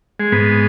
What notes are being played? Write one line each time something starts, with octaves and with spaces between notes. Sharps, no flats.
G#3
G#2 B3